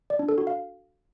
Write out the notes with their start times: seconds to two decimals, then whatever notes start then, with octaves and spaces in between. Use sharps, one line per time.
0.10 D5
0.19 D4
0.29 A4
0.38 F#4
0.47 F5